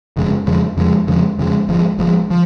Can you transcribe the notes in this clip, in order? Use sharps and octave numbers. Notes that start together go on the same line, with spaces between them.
F#1 F2 C#3 G#3
F2 C#3 F3 G#3
F2 C#3 F3 G#3
F2 C#3 F3 G#3
F2 C#3 F3 G#3
G#1 G#2 F3 G#3
G#1 G#2 F3 G#3
F3